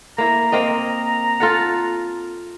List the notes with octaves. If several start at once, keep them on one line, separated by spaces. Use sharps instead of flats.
A#3 E4 A#5
A#3 C4 D#5
F4 A4 F#5